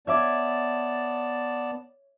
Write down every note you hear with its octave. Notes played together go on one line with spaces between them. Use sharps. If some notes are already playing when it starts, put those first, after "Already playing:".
B3 C#5 D5 E5 A5 D6